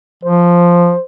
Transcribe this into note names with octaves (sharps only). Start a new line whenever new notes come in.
F3 C5